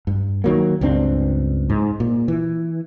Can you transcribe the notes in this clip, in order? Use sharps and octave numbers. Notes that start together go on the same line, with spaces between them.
G2
D#3 F#3 A#3
C#2 G2 C4 D4
G#2
A#2
E3